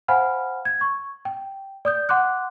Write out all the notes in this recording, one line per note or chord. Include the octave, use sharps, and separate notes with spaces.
C5 F5 F#5 G#5 B5 F6
G#6
C#6
G5
D5 D#6 G6
F#5 C6 D6 F#6